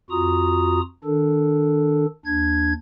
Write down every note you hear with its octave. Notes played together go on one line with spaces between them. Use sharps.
F2 F4 F#4 A#5 D#6
D#3 D4 A4
D#2 D4 G#6